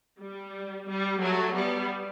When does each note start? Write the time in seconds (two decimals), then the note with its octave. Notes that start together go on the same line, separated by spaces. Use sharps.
0.21 G3
0.88 G3
1.21 F#3 A3
1.54 G3 B3